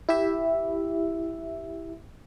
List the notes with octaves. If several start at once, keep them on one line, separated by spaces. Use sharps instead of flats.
E4 G4 E5